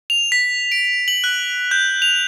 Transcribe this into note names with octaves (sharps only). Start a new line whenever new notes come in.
F7
B6
D7
F#7
F#6
G6
F7